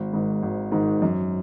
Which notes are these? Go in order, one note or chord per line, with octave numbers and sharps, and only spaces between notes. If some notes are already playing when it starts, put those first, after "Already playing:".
Already playing: G#1
G#2 D#3
G#1
G#2 D#3
F#2